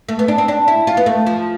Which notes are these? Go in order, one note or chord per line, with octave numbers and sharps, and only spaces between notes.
A3
B3
D4
C4
D4
E4
F4
B3
A3
F3